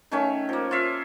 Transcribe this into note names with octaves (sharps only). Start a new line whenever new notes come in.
D#3 A3 C#4 C#5
F3 A#3
F4 C#5 E5 F5